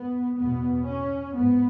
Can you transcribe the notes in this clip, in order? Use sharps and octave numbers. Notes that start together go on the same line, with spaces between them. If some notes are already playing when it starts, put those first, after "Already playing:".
Already playing: B3
E2 B2 B3
C#4
G#2 B3